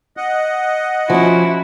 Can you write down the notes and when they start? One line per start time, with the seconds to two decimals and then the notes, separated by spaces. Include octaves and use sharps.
0.17 D#5 F#5
1.10 F3 C#4 E4 F#4